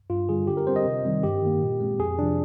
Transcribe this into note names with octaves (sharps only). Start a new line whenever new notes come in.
G2 F4
D3 G3 G#4
D3 G4
A#4
G3 C4 C5
D#5
C3
D#3 G3 C4
G2 G4
D#3 A#3
A#2
G#3 C4
F2 G#4
C3 F3 D4